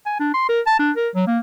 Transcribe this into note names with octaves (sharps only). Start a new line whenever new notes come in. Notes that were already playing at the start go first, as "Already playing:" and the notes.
G#5
D4
C6
A#4
A5
D4
A#4
F#3
A#3